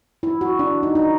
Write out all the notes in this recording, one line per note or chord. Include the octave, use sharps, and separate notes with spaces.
E4
F#4
D4
D#4
D#4